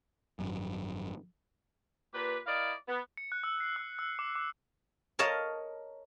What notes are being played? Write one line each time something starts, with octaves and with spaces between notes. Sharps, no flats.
G#1 F#2
A#2 G4 B4
E4 A#4 D5 D#5 F5
B3
C#7
F#6
E6
C7
E6
E6
D6
D6
A#4 C#5 D#5 F5 A5